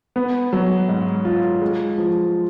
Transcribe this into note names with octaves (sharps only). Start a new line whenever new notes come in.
B3
F#3
G#2
F4
G#3
F3